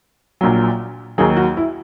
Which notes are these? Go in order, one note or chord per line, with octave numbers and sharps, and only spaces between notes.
A#1 A#2 F#3
D#2 D#3 F#3 G#4
F#4
E4